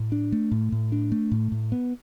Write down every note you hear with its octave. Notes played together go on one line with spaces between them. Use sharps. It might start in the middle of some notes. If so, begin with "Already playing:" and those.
Already playing: A2
D4
A3
A2
A2
D4
A3
A2
A2
B3